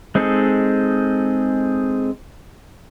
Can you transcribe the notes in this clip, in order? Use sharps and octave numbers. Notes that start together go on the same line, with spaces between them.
G#3 C4 D#4 G#4 A4